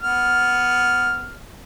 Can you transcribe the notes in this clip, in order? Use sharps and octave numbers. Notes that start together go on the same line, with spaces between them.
B3 F6